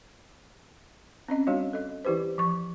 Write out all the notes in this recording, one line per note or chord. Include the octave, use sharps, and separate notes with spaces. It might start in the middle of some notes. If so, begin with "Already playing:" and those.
C4 C#4 D#5
G3 D4 F#4 C#5 D#5
A4 D#5
E3 E4 G4 B4 C5
F3 C#6